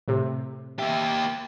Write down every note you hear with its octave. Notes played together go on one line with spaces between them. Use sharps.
A2 C3
A#3 G4 E5